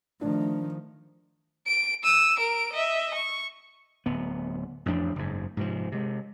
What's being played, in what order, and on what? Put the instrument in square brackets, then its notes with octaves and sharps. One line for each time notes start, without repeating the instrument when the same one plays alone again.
[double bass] D#3 F3 [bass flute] A3 [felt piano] D4
[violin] D7
E6 D#7
A#4 D7
D#5 E5
C#6
[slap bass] D1 B3
A1 F2 F3 D4
F#1 G#2
G#2 C3 F3
C3 G#3